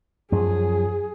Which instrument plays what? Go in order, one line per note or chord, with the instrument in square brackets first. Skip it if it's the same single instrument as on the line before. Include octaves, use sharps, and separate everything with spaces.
[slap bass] F#2 F3 [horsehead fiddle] G#4